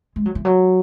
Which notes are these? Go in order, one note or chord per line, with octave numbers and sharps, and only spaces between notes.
G#3
F#3
E3
F#3